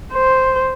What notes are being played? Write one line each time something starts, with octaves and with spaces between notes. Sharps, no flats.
C5